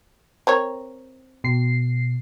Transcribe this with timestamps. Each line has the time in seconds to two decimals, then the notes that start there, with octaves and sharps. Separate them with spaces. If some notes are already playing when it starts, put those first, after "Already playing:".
0.47 C4 A#4 C#5
1.44 B2 C7